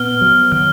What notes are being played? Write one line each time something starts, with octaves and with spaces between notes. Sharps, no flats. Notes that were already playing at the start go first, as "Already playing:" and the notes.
Already playing: A#2 B3 F6
F#3
D#3 F6